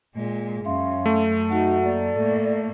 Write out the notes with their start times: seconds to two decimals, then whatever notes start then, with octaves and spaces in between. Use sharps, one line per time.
0.15 A#2 G#3
0.65 F#2 C#4 E5 F5 C6
1.06 A3
1.50 D#4 F#4 F#5
1.83 A#3 D5
2.16 A2 A#3 A4